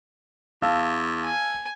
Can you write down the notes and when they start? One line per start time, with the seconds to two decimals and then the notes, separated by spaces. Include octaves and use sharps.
0.62 E2 F5 A5 E6
1.25 G#5